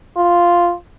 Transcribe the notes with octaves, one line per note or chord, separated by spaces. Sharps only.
F4